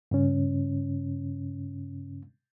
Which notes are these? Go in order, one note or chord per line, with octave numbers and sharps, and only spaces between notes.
G2 C#3 C#4